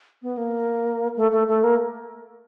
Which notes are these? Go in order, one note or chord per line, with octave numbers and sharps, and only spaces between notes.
B3
A#3
A3
A3
A3
A#3